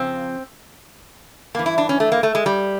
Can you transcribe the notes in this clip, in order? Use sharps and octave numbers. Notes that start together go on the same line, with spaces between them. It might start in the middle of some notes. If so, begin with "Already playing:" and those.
Already playing: F2 C#3 F3 C4
G2 E3 A#3
E4
D4
C#4
A3
A#3
A3
G#3
G3